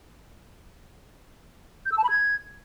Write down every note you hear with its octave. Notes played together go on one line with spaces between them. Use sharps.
G6
E6
A5
B5
G#6